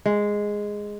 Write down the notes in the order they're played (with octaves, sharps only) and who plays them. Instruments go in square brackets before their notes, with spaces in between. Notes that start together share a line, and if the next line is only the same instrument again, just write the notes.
[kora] G#3